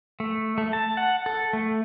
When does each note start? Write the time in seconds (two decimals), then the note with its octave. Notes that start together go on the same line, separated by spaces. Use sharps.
0.20 A3
0.58 A3
0.73 A5
0.97 F#5
1.26 A4
1.53 A3